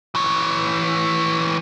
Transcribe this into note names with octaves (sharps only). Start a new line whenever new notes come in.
E3 C#5